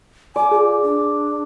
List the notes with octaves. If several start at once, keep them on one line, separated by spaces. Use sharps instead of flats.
D5 G#5
F4 G#4
D4